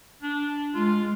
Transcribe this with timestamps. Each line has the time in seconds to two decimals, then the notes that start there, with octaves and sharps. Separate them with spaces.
0.22 D4
0.75 G#3 F4